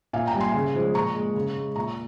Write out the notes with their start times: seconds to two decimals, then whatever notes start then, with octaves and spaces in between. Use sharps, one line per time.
0.13 A#2 F5 G#5
0.27 G5 A#5
0.34 G3
0.40 G#5 C6
0.54 C#3
0.75 F3 G#3
0.95 A#2 A#5 C#6
1.15 G#3
1.35 C#3
1.55 G#3
1.76 A#2 A#5 C#6